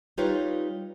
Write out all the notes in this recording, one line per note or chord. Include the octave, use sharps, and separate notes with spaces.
G3 D#4 F4 G4 B4 C#5